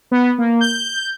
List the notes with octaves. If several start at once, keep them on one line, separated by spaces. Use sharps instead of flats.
B3
A#3
G6